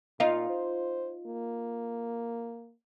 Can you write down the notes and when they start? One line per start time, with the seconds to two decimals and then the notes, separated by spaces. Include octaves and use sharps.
0.20 A#2 D#4 F4
0.50 C5
1.27 A#3